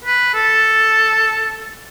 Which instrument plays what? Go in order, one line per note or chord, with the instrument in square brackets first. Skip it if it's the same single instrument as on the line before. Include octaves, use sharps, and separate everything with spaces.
[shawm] B4
A4